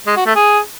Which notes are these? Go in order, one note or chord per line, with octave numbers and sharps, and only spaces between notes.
G#3
F#4
A3
G#4